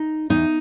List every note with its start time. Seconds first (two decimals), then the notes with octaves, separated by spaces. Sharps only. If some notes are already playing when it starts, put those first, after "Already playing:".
Already playing: D#4
0.30 E2 D#4